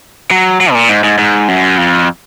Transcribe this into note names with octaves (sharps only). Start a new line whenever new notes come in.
F#3
F#3
B2
A#2
G#2
G#2
G#2
F#2
F2